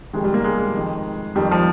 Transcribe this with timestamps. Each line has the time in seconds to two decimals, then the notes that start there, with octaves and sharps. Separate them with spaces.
0.13 F2 C3 D#3 G#3
0.24 G3
0.34 A#3
0.44 G#3
0.59 G#3
0.74 F2 D#3
1.35 F2 D#3 G3
1.52 F3